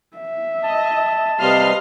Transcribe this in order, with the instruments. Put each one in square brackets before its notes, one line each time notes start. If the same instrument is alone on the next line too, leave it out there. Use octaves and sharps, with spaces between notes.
[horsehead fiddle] E5
[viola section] D#5 [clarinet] A5
[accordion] C3 G3 [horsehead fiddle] B4 [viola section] D#5 F5 C6